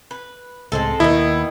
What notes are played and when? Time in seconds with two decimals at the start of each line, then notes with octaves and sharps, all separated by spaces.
0.11 B4
0.72 C#2 A2 G#3 C4 A4
1.00 D#2 B2 D#3 E4